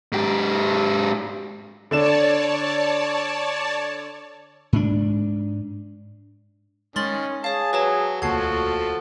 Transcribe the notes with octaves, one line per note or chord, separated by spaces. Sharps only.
G#2 G4
D3 D4 C#5 D5 A5 E7
G#2 D4
D#3 G#3 C#4 C6 A6 F#7
G#4 C#5 F5 A5
F#3 B4 C#5 A5
E1 D2 F3 A#3 F#4 A4 G#6 C7